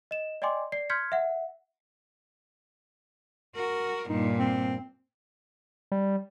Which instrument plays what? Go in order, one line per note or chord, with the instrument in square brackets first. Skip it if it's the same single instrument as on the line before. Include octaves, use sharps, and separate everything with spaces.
[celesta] D#5 E7
D5 D#5 G5 G#5 C6 D6
D5 C7
C6 F6 G6 G#6 B6 C#7
E5 F#5
[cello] F#4 A#4
[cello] G2 A#2 [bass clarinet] D#4
[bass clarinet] C4
[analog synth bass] G3